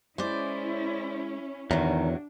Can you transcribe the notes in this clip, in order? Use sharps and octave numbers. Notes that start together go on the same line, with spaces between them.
G#3 C#4 E4 C5 D5
E2 A2 D#3 F#3 D4